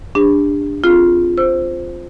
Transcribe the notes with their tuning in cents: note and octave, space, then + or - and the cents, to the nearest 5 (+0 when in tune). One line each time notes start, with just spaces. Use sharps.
D4 +0 G4 +45
C4 +0 F4 +0 G#4 +0
C5 +0 E6 +20